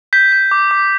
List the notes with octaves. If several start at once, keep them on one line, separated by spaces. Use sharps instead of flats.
G6 B6
G6
D6
D6